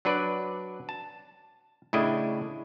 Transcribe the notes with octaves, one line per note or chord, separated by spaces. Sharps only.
F#3 D4 B4 D5
A5
A2 C#3 D4 E4 D#5